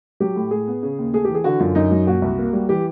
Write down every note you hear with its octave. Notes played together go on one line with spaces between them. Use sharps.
F#3 G4
A2
A2 G#4
B3
C#3
D#2
A3 G#4
E3 G4
G#4
D3 F#4
F#2 F4
F#2 D#4
F#3
A#2 F#4
C2
A#3
G3
E3 G4